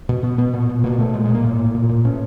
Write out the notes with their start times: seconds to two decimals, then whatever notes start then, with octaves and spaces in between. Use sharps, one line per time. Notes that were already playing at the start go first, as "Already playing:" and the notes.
0.09 B2
0.23 B2 B3
0.38 B2 B3
0.54 A#2
0.69 A#2
0.84 B2 A#3
0.98 B2 A3
1.14 A#2 G#3
1.24 G#3
1.29 A#2
1.35 A#3
1.44 A2
1.59 A2
1.75 A#2
1.89 A#2
2.05 A2 C#4